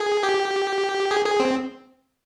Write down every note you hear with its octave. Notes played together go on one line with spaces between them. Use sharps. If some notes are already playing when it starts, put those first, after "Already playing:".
Already playing: G#4
G4
G#4
G#4
C4